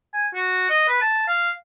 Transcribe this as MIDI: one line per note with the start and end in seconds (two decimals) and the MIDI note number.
0.14 0.27 80
0.34 0.68 66
0.70 0.86 75
0.89 1.01 71
1.01 1.24 81
1.28 1.51 77